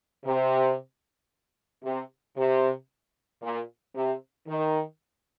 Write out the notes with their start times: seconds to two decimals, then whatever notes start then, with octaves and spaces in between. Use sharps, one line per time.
0.25 C3
1.83 C3
2.37 C3
3.43 A#2
3.95 C3
4.48 D#3